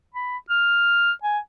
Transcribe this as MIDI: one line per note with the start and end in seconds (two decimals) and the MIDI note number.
0.15 0.37 83
0.50 1.12 89
1.24 1.39 80